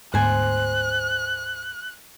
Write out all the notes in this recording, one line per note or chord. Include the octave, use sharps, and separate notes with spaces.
D2 G#2 B3 C5 G#5 F#6